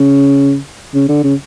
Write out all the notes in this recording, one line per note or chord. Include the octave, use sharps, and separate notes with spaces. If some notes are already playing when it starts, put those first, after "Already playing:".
Already playing: C#3
C#3
D3
C#3